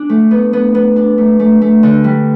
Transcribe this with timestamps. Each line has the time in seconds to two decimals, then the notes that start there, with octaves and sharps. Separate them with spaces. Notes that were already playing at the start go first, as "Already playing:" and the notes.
Already playing: D4
0.09 A3
0.31 B3
0.53 B3
0.75 B3
0.96 D4
1.18 A3
1.39 A3
1.61 A3
1.83 D3
2.04 G3